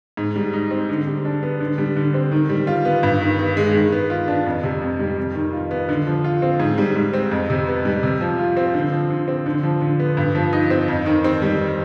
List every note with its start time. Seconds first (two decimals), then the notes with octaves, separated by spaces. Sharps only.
0.17 G#2
0.36 G3
0.53 D#4
0.71 C4
0.89 D3
1.07 G3
1.25 D4
1.43 B3
1.60 D3
1.78 G3
1.96 D3
2.14 C4
2.31 D#3
2.49 G3
2.67 F4
2.85 B3
3.03 G2
3.21 D#3
3.39 B3
3.57 G#3
3.74 D#3
3.92 B3
4.10 F4
4.28 D4
4.46 F2
4.63 C3
4.82 F2
4.99 G3
5.18 F2
5.35 D#3
5.53 F4
5.71 B3
5.89 D3
6.07 F3
6.24 F4
6.42 C4
6.60 G#2
6.78 G3
6.96 G#2
7.13 C4
7.31 F2
7.50 C3
7.67 B3
7.85 G3
8.03 C3
8.21 F3
8.39 F4
8.57 C4
8.74 D3
8.92 F3
9.10 D3
9.28 C4
9.46 D3
9.63 F3
9.81 D3
9.99 B3
10.17 G2
10.35 F3
10.53 D#4
10.70 C4
10.88 F2
11.06 D#3
11.24 C4
11.42 G3